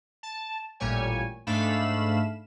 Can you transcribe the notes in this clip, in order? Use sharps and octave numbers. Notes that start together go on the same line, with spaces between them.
A5
A1 A#2 G3 C#5 G#5
G#2 A3 D4 F5 B5 E7